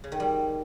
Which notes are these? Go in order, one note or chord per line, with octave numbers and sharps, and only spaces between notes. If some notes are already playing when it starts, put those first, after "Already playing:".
C#3
D#3
G3